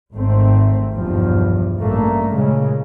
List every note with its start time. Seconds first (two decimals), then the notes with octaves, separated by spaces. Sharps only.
0.13 G#1 A3 C4
0.92 B1 E2 G2 F3
1.79 A1 G2 A3 A#3
2.35 A#2 C#3 G#3